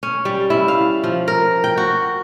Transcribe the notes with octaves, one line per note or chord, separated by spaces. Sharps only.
C#4
G3
E4
F5
F3
A#4
G5
F#4